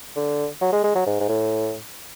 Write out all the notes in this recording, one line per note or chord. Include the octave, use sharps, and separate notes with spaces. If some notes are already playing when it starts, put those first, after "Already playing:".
D3
F#3
G#3
G#3
F#3
G#2
G#2
A2